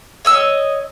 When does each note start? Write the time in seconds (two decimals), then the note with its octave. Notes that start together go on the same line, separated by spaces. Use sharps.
0.25 C#5 D#5 E6